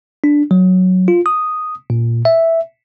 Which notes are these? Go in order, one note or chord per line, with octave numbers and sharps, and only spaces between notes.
D4
F#3
F4
D#6
A#2
E5